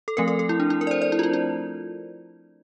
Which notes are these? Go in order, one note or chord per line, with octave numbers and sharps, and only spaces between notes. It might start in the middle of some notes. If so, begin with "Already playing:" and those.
A4
F3 A3 C4 A#4
A4
A4
E4
D4
E4
A#4
D5
C5
D5
E4
F4
E4
E4